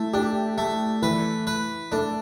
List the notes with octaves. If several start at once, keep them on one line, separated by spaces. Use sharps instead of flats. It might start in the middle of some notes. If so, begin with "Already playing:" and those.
Already playing: A3 E4
D4 G4
A3
E3 B4
B4
A3 D4